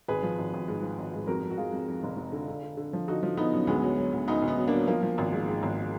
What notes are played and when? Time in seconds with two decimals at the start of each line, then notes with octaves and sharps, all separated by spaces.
0.08 G#1 G#4 B4
0.23 F3
0.39 G#1
0.53 G#1
0.68 G#2
0.83 F3
0.98 G#1
1.13 G#2
1.27 F2 F#4 A#4
1.43 F2
1.50 F#4
1.57 F2 F4 G#4
1.72 F2
1.88 F2
2.03 F1
2.17 F1
2.32 D3
2.48 D3
2.63 D3
2.77 D3
2.93 F3
3.08 D3 D#4 F#4
3.23 F3
3.37 D3 B3 D#4
3.53 F#2
3.67 D2 G#3 B3
3.83 F#3
3.98 F#3
4.13 D2
4.28 D2 B3 D#4
4.42 D2
4.47 B3 D#4
4.58 F#3
4.68 A#3 D4
4.73 F#3
4.87 F3 A#3
5.03 F3
5.18 G#1
5.32 G#2
5.48 G#2
5.63 G#1